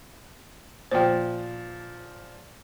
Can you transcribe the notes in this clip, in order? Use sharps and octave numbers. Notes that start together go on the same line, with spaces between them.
A#2 F3 C5 G5